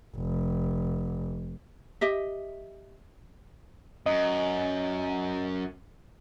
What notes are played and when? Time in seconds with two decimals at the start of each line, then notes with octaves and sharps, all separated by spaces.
0.16 F1
2.01 G4 D#5 E5
4.06 F#2 D#5